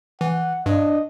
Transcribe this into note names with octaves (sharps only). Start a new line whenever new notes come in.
E3 F#5
G2 D4 D#5